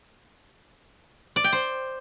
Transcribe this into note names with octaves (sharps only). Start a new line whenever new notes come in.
D5
G5
C5